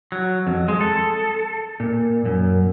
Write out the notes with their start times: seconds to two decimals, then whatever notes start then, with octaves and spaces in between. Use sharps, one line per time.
0.12 F#3
0.47 F2
0.68 G#3
0.81 A4
1.80 A#2
2.25 F#2